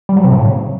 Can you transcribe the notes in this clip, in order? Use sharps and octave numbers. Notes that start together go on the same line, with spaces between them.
G3
F#3
C3
A2
C#3